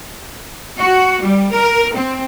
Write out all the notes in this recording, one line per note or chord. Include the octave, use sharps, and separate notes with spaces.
F#4
G3
A#4
C4